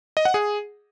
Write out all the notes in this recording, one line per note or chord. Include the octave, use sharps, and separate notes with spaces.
D#5
F#5
G#4